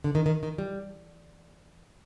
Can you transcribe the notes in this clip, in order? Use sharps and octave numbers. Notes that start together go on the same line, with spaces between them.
D3
D#3
D#3
D#3
G3